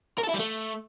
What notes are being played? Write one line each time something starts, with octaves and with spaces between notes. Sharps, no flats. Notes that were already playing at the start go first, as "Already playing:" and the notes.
A#4
A4
E4
G3
A3